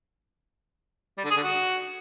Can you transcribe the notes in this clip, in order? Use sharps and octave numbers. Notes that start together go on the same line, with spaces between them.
G3
D3
G#4
D3
F#4